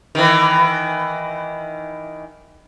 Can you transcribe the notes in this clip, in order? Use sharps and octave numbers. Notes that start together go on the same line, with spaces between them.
D#3 E3